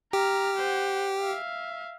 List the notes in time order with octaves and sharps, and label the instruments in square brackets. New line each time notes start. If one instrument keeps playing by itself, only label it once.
[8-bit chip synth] G4 [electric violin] A#5 F6
[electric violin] C5 F#5
E5 F5